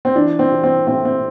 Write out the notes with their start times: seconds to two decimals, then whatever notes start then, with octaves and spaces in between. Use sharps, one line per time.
0.05 C4
0.15 E3 D4
0.39 C4
0.52 E3
0.64 C4
0.87 A2 C4
1.05 C4